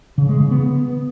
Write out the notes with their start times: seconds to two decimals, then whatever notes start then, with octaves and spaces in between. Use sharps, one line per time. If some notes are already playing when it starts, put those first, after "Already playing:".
0.18 C#3
0.29 G#3
0.40 C#3
0.51 B3